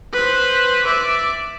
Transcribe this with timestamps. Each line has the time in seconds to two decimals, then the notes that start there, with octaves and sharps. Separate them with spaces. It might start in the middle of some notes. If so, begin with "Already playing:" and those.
0.13 B4 C5
0.84 D5 E5